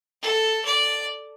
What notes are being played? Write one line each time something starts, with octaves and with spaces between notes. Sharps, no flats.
A4
D5